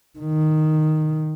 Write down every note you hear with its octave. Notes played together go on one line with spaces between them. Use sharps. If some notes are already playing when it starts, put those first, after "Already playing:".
D#3